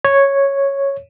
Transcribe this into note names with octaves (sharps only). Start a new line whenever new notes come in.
C#5